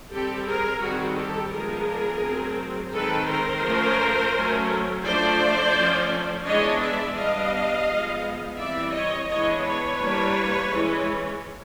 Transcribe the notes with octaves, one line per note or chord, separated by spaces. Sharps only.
G3 C4 G4 A4
G#4 A#4
D#3 G3 C4 F#4 G#4
G4 A4
F3 G#3 B3 D4 G#4 A#4
F#3 A3 C4
D#3 G#3 C4 A4 B4
A#4 C5
F3 A3 C#4
F#3 A3 C#4
F3 A3 D4 C5 D5
F3 A3 C#4
E3 G#3 B3 D4 C#5 D#5
D5 E5
G3 B3 D4 D#5 F5
F3 G#3 B3
E3 G3 C4 D5 E5
C#5 D#5
E3 G#3 B3 D4 C#5 D#5
B4 C#5
E3 G3 A#3 D4
E3 G#3 C#4